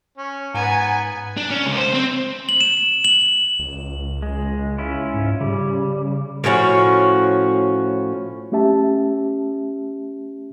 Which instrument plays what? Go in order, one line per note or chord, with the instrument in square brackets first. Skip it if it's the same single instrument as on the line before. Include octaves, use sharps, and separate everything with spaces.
[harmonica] C#4
[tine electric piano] G#2 [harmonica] B3 A#5 [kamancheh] G#5
[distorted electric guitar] D4
C#4
C#2
C5
C4
[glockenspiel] F#7
E7
F#7
[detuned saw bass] C#2
[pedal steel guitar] G#3
C#4 E4 F4
[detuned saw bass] G#2
[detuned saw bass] C#3 [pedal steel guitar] G3
[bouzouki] A2 F3 C#4 F#4
[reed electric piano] A3 C#4 G4 E5 A5